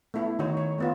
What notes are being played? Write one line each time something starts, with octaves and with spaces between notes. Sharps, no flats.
A3 B3 E4 A4
D#3 D#4 F#4 C#5
C#5
A3 B3 F4